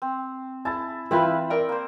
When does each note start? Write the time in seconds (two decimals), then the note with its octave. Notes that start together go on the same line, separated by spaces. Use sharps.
0.02 C4
0.65 E4 G#5 A5 A6
1.11 E3 C4 E4 F4 B4 E5 B5
1.50 A#4 D5 G5
1.69 A#3 C5